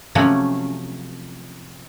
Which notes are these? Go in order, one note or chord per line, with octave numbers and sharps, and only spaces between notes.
C3 F3 F#3 A3 C#4